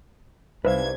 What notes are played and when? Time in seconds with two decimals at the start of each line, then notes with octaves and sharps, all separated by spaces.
0.65 C2 D#4 B4 C5 E5 F5 G#6